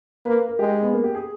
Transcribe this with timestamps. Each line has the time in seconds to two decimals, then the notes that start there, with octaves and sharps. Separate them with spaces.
0.26 A#3 B4
0.48 A#4
0.59 G#3 G4
0.71 D#4
0.82 B3
0.92 A#3
1.04 G4
1.15 G#4